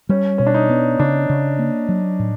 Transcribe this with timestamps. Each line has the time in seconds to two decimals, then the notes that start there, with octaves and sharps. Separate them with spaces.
0.09 G3 C#4
0.38 B2 C#4
0.47 D4
0.54 D#4
0.70 B3
0.99 C#3 D4
1.29 C#3
1.59 A#3
1.89 F#3
2.19 A2